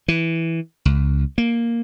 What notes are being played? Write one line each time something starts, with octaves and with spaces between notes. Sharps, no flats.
E3
C#2
A#3